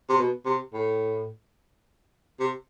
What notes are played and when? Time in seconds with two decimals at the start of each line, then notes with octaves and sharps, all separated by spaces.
0.09 C3
0.18 B2
0.45 C3
0.73 A2
2.40 C3